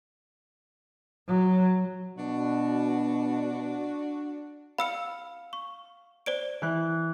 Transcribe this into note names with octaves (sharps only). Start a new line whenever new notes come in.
F#3
B2 D4 F#4
F5 B5 E6 C#7
C#6
C5 D5 D7
E3 F#6